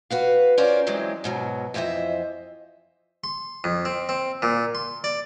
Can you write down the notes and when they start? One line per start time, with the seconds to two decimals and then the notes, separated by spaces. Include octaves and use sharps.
0.10 F#4 B4 F5
0.57 C#4 F4 A#4 C5 D5
0.87 E3 F#3 G#3 C4
1.24 G#2 B2 F#3
1.74 F2 E3 C5 D#5 E5
3.24 C6
3.64 F2
3.85 C4
4.09 C4
4.42 A#2
4.75 C6
5.04 D5